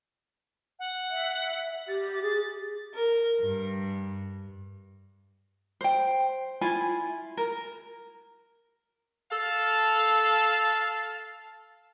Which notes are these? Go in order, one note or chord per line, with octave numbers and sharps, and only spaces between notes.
F#5
E5
G4 A6
G#4 A6
A#4
G2
C5 G5
E4 F4 G#5
A#4
A4 F5 A5